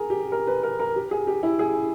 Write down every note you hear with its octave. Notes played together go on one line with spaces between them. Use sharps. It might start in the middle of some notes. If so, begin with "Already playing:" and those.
Already playing: G#4 A#4
G4
A#4
B4
A#4
A#4
G4
G#4
G4
E4
G#4